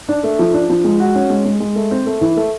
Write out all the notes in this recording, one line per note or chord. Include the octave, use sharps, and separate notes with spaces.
D4
A3
F3
D4
F3
G#3
F#4
C#4
G#3
G#3
G#3
A3
C4
A3
E3
A3